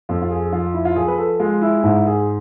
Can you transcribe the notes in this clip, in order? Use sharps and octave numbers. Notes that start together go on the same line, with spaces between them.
F2 F4
F4
G#4
F3 F4
E4
F4
F3 G#4
B4
A4
G#3 F4
E4
G#2 E4
G#4